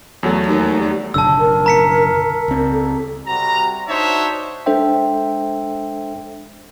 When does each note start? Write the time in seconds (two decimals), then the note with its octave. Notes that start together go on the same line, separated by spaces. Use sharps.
0.23 E2 F#3 A3
0.47 D#2
0.81 G3
1.14 F#1 B1 D3 A5 E6
1.39 A#4
1.66 A#5 B6 C#7
2.48 C#2 C4
2.72 A4
3.27 C3 G3 F#4 A#5
3.89 D4 D#4 F#4 C5 C#5 E5
4.66 G#3 D4 A4 C5 E5 G5